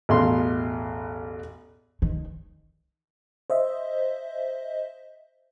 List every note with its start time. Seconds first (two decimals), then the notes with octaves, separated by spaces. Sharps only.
0.09 A1 E2 B2 F5 C6
2.02 D#3
3.50 C5 D#5 E5